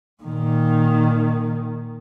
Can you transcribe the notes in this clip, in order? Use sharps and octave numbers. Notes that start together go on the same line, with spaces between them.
A#2 D#3